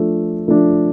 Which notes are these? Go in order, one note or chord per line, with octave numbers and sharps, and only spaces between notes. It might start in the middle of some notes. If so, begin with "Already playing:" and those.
Already playing: F3 A3 D4
F3 A3 D4